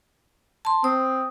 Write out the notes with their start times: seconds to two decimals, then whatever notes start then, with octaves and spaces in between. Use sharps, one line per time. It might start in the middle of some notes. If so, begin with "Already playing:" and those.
0.65 A5 C6
0.84 C4 D#6